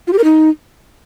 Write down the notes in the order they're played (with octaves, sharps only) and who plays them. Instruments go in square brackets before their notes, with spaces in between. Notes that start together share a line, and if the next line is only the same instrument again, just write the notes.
[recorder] F4
G4
A#4
D#4